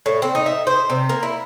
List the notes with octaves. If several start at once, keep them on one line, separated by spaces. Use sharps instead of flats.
A2
C4
D#4
E5
C5
C3
A#3
E4